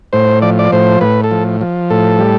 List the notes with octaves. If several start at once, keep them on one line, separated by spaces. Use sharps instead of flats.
A2 C5
F3 D5
D5
A2 C5
A2 B4
A4
F3
F3
A2 A4
G3